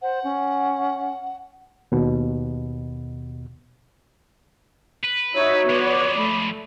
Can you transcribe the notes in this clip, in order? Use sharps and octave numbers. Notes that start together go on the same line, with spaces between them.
C5 F#5
C#4
D#2 B2
B4
D#4 F#4 C#5 E5
F3 G#3 B3 D5
A3 B5